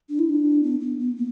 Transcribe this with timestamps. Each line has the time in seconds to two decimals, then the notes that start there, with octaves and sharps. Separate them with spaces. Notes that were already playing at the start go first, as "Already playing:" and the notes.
0.09 D4
0.19 E4
0.29 D4
0.63 B3
0.80 B3
0.99 B3
1.16 A#3